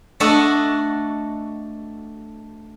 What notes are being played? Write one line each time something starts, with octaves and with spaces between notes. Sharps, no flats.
A3 D4 F#4 A4 D#5 F#5